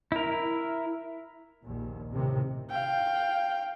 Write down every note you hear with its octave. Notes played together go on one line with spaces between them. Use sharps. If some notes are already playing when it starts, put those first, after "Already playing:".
E4 A#4
A#1 D#2 A#2
A2 C3 D#3
F5 G5